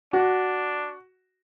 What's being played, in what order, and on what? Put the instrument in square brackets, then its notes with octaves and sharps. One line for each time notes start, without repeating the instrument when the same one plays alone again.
[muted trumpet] D4 [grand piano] F#4